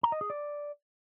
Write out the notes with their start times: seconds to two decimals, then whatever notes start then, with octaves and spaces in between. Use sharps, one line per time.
0.03 A#5
0.12 D#5
0.21 G#4
0.30 D5